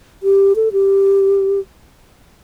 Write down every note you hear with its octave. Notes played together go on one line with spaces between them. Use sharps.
G4
A4
G4